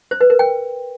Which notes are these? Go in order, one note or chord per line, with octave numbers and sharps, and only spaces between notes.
C5
B4
A#4
G5